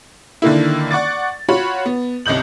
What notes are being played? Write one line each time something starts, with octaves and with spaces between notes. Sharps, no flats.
D3 D#3 A#3 E4
D5 F#5 C#6 D6 A6
F4 F#4 C#5 F#5 B5
B3
G1 C2 D#5 G6 F#7